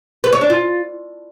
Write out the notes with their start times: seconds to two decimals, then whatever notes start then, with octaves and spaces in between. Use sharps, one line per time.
0.24 B4
0.33 C#5
0.41 D4
0.50 F4